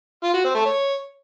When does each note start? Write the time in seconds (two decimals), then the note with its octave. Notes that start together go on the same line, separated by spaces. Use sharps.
0.23 F4
0.34 F#4
0.44 C4
0.55 A3
0.65 C#5